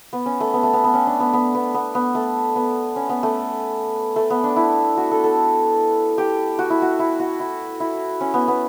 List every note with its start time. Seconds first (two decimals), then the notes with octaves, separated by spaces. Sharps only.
0.13 B3
0.26 C#4
0.40 A3
0.54 B3
0.63 A3
0.73 B3
0.84 B3
0.94 C#4
1.07 D4
1.20 B3
1.33 B3
1.55 B3
1.74 B3
1.95 B3
2.15 A3
2.56 B3
2.96 C#4
3.09 B3
3.23 A3
4.16 A3
4.30 B3
4.44 D4
4.56 E4
4.97 F#4
5.11 A4
5.24 A4
6.18 G4
6.59 F#4
6.70 E4
6.82 F#4
6.99 E4
7.20 F#4
7.40 E4
7.80 E4
8.21 C#4
8.34 B3
8.48 B3